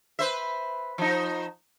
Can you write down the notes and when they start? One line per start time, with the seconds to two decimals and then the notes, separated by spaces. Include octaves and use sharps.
0.19 B4 C5 E5
0.98 F3 D#4